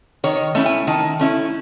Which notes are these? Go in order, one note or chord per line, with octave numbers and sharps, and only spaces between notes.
D#3 C#5
A3 C#4 E4
G#5
D#3 A5
A3 C#4 E4